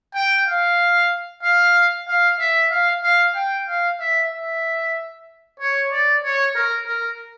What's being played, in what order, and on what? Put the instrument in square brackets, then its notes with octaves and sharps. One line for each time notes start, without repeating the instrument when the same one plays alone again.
[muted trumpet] G5
F5
F5
F5
E5
F5
F5
G5
F5
E5
E5
C#5
D5
C#5
A#4
A#4